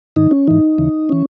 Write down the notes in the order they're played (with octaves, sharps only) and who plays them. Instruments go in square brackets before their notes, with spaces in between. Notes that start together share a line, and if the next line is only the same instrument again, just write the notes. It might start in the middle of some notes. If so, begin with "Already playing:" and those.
[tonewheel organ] G#2 D#3 D#4
C#4
G#2 E3 D#4
D#2 C#3 E3
E3 C#4